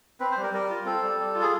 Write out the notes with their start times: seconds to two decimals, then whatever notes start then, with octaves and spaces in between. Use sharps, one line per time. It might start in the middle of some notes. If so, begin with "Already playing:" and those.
0.20 C4 B4
0.31 C5
0.37 G3
0.43 A#4
0.53 G3 A#4
0.70 F4
0.85 C4 A4
1.03 G3
1.19 G3
1.35 F4
1.42 G#4